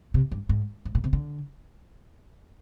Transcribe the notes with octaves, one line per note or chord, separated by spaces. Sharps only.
C3
G2
G#2
G#2
A#2
C3
D3